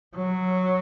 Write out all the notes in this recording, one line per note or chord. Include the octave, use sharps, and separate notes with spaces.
F#3